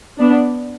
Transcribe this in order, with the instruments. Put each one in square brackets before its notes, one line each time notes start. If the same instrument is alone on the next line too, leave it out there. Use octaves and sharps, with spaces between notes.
[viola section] B3 D4